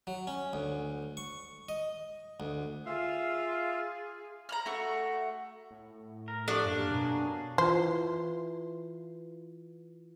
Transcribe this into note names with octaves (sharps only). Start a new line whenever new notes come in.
F#3
C#4
D2
C#6
D#5
D2
F4 G#4 E5 F5
A#5 B5 F6
A3 F#4 C#6
A2
A#4
F3 D4 G4 A4 F#5 C#6
F#2 A#3 F5
B2 F#3 A#3 G#4
E3 F4 C5